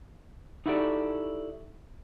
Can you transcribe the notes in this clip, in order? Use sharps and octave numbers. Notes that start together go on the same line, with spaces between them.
D#4 E4 F#4 G4 A4 D5